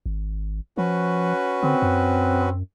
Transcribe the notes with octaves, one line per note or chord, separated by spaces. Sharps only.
G#1
F3 C#4 F#4 B4
D3 C4
F#2